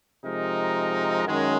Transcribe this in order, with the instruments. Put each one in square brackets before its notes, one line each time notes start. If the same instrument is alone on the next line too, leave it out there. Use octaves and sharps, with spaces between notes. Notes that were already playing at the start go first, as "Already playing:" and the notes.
[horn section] C3 F3 G#3 D#4 A#4
F#2 D#3 G#3 C#4